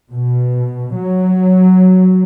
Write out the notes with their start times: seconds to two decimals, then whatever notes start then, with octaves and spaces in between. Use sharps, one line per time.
0.12 B2
0.99 F#3